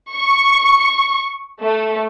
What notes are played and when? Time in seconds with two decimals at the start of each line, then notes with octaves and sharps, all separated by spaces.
0.12 C#6
1.61 A3